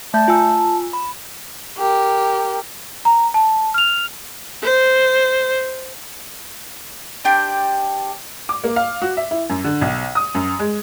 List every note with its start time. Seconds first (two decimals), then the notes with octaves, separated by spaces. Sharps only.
0.14 A3 E5 A5 G6
0.28 F4 G#5 E6
0.93 B5
1.78 G4 A#4
3.05 A#5
3.34 A5
3.74 F6 F7
4.63 C5
7.24 D4 G4 G5 C6
8.49 D6
8.64 A#3
8.76 F5
9.02 F#4
9.17 E5
9.31 E4
9.49 F#2
9.64 D3
9.81 B1
10.15 D#6
10.35 F#2
10.59 G#3